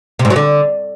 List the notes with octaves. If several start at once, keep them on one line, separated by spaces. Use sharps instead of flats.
C3
G#2
F#3
D3